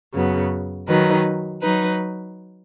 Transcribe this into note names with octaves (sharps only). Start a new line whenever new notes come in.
F#2 C#3 F#3 B3
D#3 F#3 D#4 B4
F#3 D#4 B4